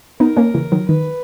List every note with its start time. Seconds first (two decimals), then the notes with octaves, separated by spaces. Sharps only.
0.20 B3 D#4 A#4
0.37 A#3 C#4
0.54 C#3 E3
0.72 D#3 F#3
0.89 D#3 B4